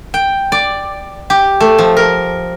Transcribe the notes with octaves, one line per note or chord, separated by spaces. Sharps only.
G5
D5
G4
A3
F3
A#4